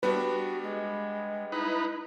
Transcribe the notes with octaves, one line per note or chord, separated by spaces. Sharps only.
G3 B3 D4 F#4 B4
G#3
D#4 E4 B4